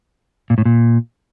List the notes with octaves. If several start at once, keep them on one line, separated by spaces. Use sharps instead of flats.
A#2
A2
A#2